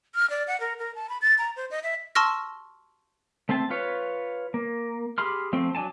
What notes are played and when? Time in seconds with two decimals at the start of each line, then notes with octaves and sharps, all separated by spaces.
0.15 F6
0.30 D5
0.47 F#5
0.60 A#4
0.79 A#4
0.95 A5
1.09 B5
1.22 A6
1.38 A#5
1.56 C5
1.71 D#5
1.83 E5
2.15 A5 C6 C#6 E6 F6 A#6
3.49 A3 C4 G5 A5
3.70 F4 B4 C#5
4.54 A#3
5.18 G4 G#4 B5 C6 F6
5.53 F3 A3 C4
5.75 F#3 D4 G#5 A5